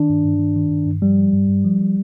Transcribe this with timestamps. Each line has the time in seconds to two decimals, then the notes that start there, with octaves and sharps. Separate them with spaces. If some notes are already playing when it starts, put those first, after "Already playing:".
Already playing: D#3 D4
0.10 G2
0.25 G2
0.40 D#3
0.56 D#3
0.71 G2
0.86 G2
1.02 F3 G3
1.18 F3
1.33 G2
1.48 G2
1.65 F3
1.80 F3